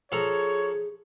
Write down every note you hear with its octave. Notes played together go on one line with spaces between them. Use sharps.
F3 G#4 A4 C#5 A#5